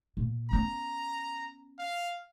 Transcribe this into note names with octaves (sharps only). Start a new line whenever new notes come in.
A#2
B3 C#4 A#5
F5